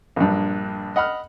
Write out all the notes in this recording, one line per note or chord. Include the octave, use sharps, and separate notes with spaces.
A#1 G2
D#5 F#5 B5 F6